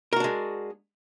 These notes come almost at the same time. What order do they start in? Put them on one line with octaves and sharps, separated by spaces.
A#4 F#4 D4 G#3